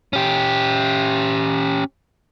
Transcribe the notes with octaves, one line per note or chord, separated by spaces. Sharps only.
C#4 G4